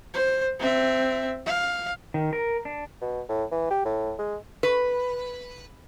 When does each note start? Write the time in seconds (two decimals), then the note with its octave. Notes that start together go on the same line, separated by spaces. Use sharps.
0.14 C5
0.59 C4 E5
1.46 F5
2.14 D#3
2.33 A#4
2.65 D4
3.01 B2
3.29 A2
3.52 E3
3.71 G4
3.85 A2
4.19 G#3
4.63 B4